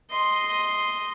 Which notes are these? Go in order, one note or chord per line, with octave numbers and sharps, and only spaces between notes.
D#5 C6